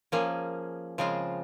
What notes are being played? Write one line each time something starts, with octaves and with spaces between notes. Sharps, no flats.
F3 A#3 C#4 G#4
C#3 F3 G#3 C4 F4